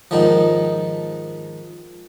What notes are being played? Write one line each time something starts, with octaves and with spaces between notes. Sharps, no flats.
G#2 D#3 F3